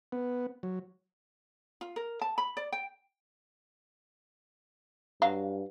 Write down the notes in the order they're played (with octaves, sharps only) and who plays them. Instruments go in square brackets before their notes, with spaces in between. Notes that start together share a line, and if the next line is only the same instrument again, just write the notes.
[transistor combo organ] B3
F#3
[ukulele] F4
A#4
A5
B5
D5
G5
[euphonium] G2 [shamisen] F#3 F5